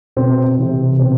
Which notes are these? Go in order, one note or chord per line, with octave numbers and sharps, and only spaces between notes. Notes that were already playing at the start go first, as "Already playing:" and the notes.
B2 C4
C3 E3
B2 C4